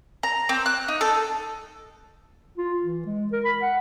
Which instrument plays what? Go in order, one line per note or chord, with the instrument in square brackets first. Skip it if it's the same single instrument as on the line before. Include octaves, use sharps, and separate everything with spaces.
[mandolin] A#5
C4
F#6
D#4
A4
[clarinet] F4
E3
G#3
A#4
B5
F#5